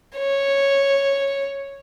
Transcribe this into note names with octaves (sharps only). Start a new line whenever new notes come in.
C#5